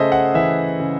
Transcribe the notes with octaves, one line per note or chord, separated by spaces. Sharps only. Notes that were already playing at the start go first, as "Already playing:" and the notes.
Already playing: C#3 A3 G#4 A4 C5 D#5 E5
F#5
E3 E5
C#3